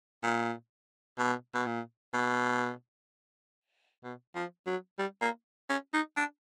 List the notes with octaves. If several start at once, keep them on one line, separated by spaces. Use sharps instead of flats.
A#2
B2
B2
A#2
B2
B2
F3
F#3
G3
A#3
C#4
D#4
D4